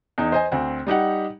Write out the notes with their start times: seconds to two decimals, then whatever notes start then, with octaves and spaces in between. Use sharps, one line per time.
0.18 E2 D#4
0.32 C5 D#5 G#5
0.52 D2 C4
0.87 G3 D#4 G4 F#5